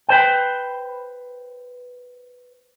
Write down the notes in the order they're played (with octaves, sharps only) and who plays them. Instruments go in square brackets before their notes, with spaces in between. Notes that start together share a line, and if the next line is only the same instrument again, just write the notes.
[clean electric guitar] B4 C5 G5